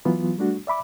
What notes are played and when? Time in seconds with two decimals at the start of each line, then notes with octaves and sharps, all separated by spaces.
0.05 E3 F#3 B3 F4
0.37 G3 A3 D4 F#4
0.67 D5 E5 B5 D6